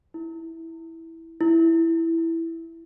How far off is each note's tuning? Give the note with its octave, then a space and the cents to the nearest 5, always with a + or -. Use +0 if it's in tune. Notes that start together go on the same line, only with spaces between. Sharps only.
E4 -10
E4 +0